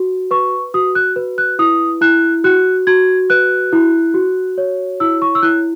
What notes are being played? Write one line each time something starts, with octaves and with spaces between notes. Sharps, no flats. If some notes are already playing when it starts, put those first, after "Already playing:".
Already playing: F#4
B4 C#6
F#4 D#6
F#6
B4
F#6
E4 D#6
E4 F#6
F#4 F#6
F#4 G#6
B4 F#6
E4
F#4
C#5
E4 E6
C#6
E6
E4 F#6